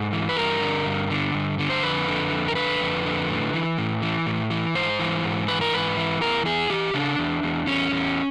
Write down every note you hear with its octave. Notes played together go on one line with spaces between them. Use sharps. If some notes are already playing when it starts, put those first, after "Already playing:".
Already playing: G#2 A4
E3
B4
G2 A#4
D3
G2
D3
G2
D3
C5
F2 B4
D3
F2
A#4
D3 B4
F2
D3
A2
E3
A2
E3
A2
E3
G#2 C5
E3
G#2
E3 B4
A#4
G#2 B4
E3
E2 A#4
E2 G#4
E3 G4
C#3 D4
E2
E2
E2 C#4
E2